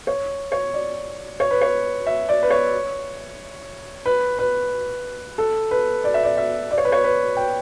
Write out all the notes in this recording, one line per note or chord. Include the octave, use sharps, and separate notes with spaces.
C#5
C#5
D5
C#5
B4
C#5
E5
D5
B4
C#5
B4
B4
A4
B4
D5
E5
D5
E5
D5
C#5
B4
C#5
B4
G5